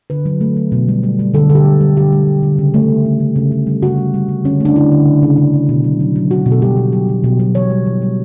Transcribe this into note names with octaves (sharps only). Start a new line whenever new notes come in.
D3 B4
F#3
A3
F#3
B2
G3
G3
G3
D3 A4
D3 A4
G4
G3
G3
D3 G4
G3
D3
D3
C#3
A3
C#3
C#3
C#3
C#3
C#3
G3
C#3 F#4
G3
G3
G3
D3 C#4
A3 D4
D3 E4
D3
C#3
C#3
C#3
C#3
B2
F#3
F#3
F#3
B2 F#4
B2
A4
G3 G4
B2
F#3
F#3
B2
F#3
E3 C#5
G3
E3
G3